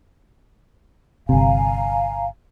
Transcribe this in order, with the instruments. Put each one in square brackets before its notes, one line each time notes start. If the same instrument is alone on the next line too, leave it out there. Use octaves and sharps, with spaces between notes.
[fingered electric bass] G1 C3 [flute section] F5 G#5 A#5